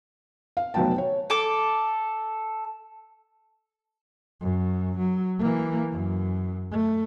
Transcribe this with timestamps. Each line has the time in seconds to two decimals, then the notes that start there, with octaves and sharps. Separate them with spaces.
0.57 F5
0.74 F1 B2 F#3 B3 G5 A5
0.98 C#5
1.30 A4 D6
4.41 F#2
4.98 F#3
5.39 E3 A#3
5.92 F#2
6.71 A3